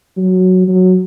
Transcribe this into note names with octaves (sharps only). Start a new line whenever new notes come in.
F#3
F#3